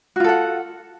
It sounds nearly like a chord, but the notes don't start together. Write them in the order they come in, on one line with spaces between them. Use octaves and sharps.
F#4 F4 A4 F#5